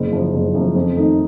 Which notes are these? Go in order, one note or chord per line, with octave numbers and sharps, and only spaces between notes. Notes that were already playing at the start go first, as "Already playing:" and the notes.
Already playing: F#1
F#2 F3
F#1
F#2 F3
F2
D#3 A3 D#4